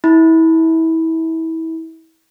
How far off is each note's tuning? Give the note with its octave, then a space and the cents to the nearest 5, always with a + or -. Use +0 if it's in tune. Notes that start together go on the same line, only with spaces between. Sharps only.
E4 -30 E5 -25 B5 +0